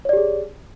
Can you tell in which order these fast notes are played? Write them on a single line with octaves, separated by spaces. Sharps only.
C#5 D5 G4 G#4